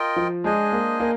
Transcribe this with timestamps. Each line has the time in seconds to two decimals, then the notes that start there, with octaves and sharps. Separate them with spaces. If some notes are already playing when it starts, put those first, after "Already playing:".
Already playing: F4 A#4 D#5 G5
0.16 F3
0.44 G#3 D4 G#4 C5 D#5 G#5
0.72 A#3
1.00 A#3